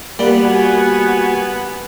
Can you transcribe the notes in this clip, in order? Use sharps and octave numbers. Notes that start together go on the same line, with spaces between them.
G3 A#3 B3 B4 F#5
F#4 G#5